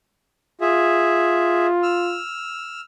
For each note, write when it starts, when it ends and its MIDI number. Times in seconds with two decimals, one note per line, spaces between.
0.61 2.19 65
0.61 1.67 68
0.61 1.67 76
1.83 2.81 88
1.83 2.81 89